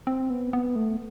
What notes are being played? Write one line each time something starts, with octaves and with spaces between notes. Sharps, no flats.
C4
B3
B3
A3